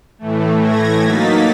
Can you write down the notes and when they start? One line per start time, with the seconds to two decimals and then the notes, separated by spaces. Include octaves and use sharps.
0.19 A2 E3 A3
0.61 G#6 A#6
1.04 F#3 A#3 D#4 A6 B6